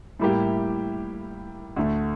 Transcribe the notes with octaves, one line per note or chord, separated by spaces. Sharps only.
A2 G3 A#3 E4 G4
D2 D3 A3